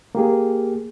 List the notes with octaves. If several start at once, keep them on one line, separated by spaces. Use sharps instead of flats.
A#3 G4 G#4